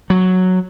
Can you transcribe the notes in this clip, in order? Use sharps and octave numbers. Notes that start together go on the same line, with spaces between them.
F#3